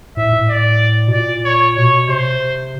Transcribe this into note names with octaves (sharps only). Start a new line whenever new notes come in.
A2 E5
A2
D5
B2
A#2 D5
C#5
B2 C#5
C3 C5